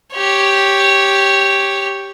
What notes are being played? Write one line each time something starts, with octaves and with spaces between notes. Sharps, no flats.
G4 C#5